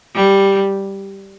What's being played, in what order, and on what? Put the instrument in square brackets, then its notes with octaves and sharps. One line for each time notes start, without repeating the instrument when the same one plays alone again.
[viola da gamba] G3